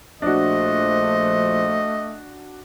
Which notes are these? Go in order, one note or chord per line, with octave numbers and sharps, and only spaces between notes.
A#1 F3 A3 D4 F#4 C5 D#5